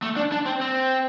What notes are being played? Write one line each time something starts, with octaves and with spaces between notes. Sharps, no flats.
A3
D4
D4
C4
C4